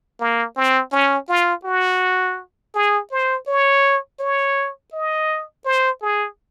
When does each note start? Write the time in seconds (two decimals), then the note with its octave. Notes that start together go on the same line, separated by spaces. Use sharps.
0.20 A#3
0.56 C4
0.92 C#4
1.29 F4
1.65 F#4
2.75 G#4
3.11 C5
3.47 C#5
4.20 C#5
4.93 D#5
5.65 C5
6.02 G#4